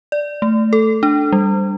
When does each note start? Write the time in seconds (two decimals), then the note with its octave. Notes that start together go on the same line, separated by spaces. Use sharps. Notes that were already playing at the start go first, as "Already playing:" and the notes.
0.12 D5
0.42 A3
0.73 A4
1.03 D4
1.32 G3